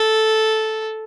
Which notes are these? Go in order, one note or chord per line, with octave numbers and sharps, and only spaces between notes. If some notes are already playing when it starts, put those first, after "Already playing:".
Already playing: A4